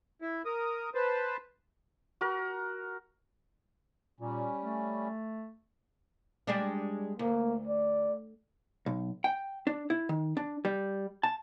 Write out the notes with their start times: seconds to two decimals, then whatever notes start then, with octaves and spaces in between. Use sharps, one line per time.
0.22 E4
0.45 A#4 D#6
0.95 B4 C5 A5
2.21 F#4 A#4
4.20 A#2 G3 C#4
4.63 A3
6.47 G3 G#3 D4
7.19 D2 A#3
7.67 D5
8.86 B1
9.24 G5
9.67 D4
9.90 E4
10.09 D#3
10.37 D4
10.65 G3
11.23 A5